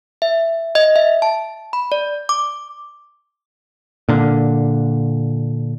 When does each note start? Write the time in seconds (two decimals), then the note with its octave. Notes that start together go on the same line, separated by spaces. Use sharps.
0.22 E5
0.75 D#5
0.96 E5
1.22 A5
1.73 B5
1.92 D5
2.29 D6
4.09 A#2 D3